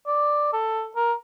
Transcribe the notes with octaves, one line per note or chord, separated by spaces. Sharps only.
D5
A4
A#4